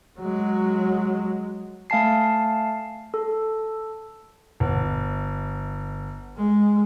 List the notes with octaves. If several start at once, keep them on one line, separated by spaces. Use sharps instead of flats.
F#3 G#3
A3 F5 G#5 A5 C7
A4
G1
G#3